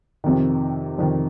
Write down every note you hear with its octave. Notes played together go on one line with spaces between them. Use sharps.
F2 C3 D#3
F2 C3 D#3